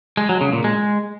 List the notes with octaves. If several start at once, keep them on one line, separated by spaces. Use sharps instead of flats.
G#3
F#3
C#3
A#2
G#3